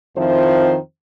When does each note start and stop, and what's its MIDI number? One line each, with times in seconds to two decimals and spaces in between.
0.17 0.77 41
0.17 0.77 51
0.17 0.77 53
0.17 0.77 60
0.17 0.77 64
0.17 0.77 72